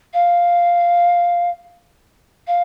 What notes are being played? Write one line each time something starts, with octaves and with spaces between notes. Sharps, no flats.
F5
F5